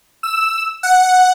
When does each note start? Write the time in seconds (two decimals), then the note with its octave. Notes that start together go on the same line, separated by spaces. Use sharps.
0.23 E6
0.83 F#5